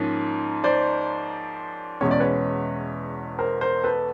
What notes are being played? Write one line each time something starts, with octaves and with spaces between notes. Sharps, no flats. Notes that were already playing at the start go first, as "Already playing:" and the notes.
Already playing: G#2 F3 A#3 C#4
C5 D5
E2 B2 G#3 C#4 C#5
D5
B4 C#5
A#4 C5
A#4 C5
A4 B4